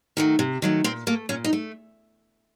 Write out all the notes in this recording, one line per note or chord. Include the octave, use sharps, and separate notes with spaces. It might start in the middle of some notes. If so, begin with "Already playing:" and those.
D#3 F#3 A3
C3
D#3 F#3 A3
A#2 C4
A3 A#3
A#2 C#4
D#4
A3